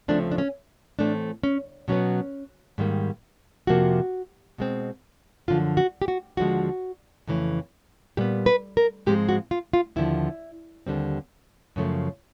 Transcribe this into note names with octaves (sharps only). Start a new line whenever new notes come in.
D2 C#3 F3 A3 C4 D4
D4
C#4
A2 E3 A3 C4 D4
C#4
B2 F#3 B3 C#4
G#2 D#3 G3 A#3
F2 C3 F3 A#3 F#4
B2 G#3 C4
F#2 D3 F3 F4
F#4
G4
F#4
D#2 D3 F3 G#3 F#4
F2 C#3 E3 A3
A#2 G3 B3 G4
B4
A#4
G#2 F3 G#3 C4 G4
F#4
F4
F4
D#2 D3 F3 E4
D#2 D3 G3 C4
F#2 C#3 F3 A3